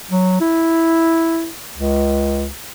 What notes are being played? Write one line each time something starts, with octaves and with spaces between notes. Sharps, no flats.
F#3
E4
C#2